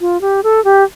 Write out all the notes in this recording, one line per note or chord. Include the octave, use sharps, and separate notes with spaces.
F4
G4
A4
G4